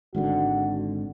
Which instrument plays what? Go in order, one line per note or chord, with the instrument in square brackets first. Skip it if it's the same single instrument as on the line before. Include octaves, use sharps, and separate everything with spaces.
[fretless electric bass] G#1 G#2 D3 [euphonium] F#4